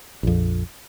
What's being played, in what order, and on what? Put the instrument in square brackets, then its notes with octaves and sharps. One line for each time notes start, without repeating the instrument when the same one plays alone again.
[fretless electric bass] A#1 F2